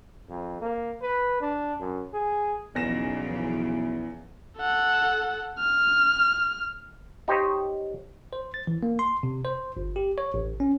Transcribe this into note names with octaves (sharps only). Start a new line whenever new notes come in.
F2
A#3
B4
D4
F#2
G#4
B1 E2 C#3 E3 F3 D#4 A#6 E7
E4
A4 F#5
F6
D#4 G4 C5 C#5 D#5
C5
A6
E3
A#3
C6
C3
C5
G1
G4
C#5
A1
C#4